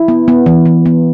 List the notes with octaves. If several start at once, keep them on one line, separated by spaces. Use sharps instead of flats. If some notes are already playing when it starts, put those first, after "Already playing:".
Already playing: E4
B3
B3
E3
E3
B3